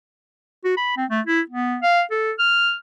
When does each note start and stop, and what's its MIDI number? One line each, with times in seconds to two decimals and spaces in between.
0.65 0.76 66
0.77 0.97 83
0.97 1.05 60
1.10 1.21 57
1.27 1.41 64
1.50 1.77 59
1.83 2.02 77
2.11 2.32 69
2.39 2.75 89